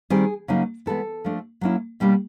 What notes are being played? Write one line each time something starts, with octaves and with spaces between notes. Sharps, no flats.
D#3 G3 C4 G#4
C#3 F#3 A#3 D#4
E3 G#3 B3 A4
F3 A3 D4
F#3 A#3 C#4 E4
B2 G3 A#3 D4